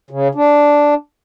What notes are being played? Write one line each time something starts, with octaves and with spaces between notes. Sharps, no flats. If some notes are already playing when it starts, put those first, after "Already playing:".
C#3
D4